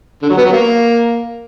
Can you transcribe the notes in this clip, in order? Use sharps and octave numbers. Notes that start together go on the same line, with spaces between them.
D3
F#3
B3
F#3
A#3